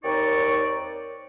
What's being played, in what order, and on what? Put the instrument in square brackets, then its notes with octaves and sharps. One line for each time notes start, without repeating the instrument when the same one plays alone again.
[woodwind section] D#2 C4 D#4 C#5 D5 C#6